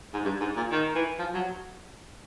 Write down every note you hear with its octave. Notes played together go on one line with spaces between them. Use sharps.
G#2
G2
G#2
A#2
D#3
E3
F3
F#3